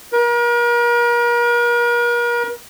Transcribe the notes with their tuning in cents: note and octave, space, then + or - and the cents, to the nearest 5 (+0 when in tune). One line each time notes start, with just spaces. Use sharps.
A#4 +40